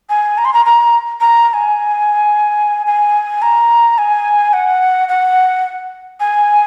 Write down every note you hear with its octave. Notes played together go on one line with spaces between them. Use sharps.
G#5
A#5
C6
A#5
A#5
A#5
A#5
G#5
G#5
A#5
G#5
F#5
F#5
G#5